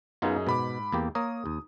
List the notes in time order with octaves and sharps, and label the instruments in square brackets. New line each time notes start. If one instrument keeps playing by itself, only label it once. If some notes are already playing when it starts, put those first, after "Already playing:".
[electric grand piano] F#2 G#4 D#5 [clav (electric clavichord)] B3 D#4 F4
[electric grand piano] G#2 B5 D6 [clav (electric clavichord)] B2
[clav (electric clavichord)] E2 A#3 G4
[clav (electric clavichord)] A#3 A#4 C#5 [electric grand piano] D#6
[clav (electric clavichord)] D#2